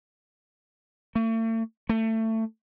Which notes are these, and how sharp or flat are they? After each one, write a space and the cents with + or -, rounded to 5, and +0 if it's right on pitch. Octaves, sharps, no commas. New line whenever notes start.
A3 +40
A3 +20